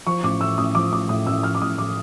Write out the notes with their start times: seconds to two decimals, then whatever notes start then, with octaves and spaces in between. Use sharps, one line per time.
0.07 F3 C#6
0.23 A1 D6
0.41 A2 E6
0.58 A1 D#6
0.75 F3 D6
0.92 A1 D6
1.09 A2 D#6
1.27 A1 E6
1.43 F3 F6
1.55 D6
1.61 A1 D#6
1.78 A2 D6